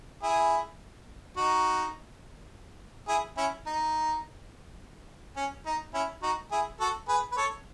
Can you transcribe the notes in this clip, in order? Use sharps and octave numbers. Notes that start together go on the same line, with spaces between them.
E4 G#4
D#4 F#4
E4 G#4
C#4 E4
D#4
C#4
D#4
C#4 E4
D#4 F#4
E4 G#4
F#4 A4
G#4 B4
B4
A4 C#5